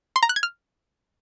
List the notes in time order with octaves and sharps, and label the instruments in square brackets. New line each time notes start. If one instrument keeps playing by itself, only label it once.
[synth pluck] C6
A#5
F#6
G#6
F6